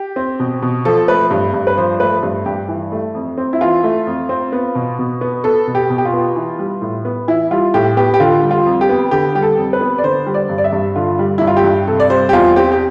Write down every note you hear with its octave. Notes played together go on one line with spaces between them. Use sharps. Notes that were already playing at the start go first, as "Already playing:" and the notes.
Already playing: G4
C4
B2
B2
F3 A4
A3 B4
G2
G2
B4
F3 C5
A3 B4
G2
G2 G4
E3
A3
F2
C4
E4
E3 F4
A3
F2
C4
B3
B2
B2
B3
B3 A4
B2
G4
B2
G4
F4
B3
E3
G3
A2
B3
E3 E4
G3 F4
A2 G4
B3 G4
G4
D3 F4
G3
F4
F2
G4
B3
D3 G4
G3 G4
A4
F2
B4
B3
D5
D3 C5
G3
D5
G2
D5
E5
G2
D3 F4
G3
G2 E4
F4
G4
G2
C3 A4
D5
G3 C5
G4
E2 F4
C4 G4
G4